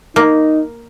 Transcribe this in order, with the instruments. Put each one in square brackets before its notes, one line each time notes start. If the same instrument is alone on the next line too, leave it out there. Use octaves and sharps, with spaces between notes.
[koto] A#3 [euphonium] D#4